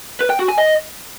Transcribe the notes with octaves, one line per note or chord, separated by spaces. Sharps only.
B4
G5
F#4
G#5
D#5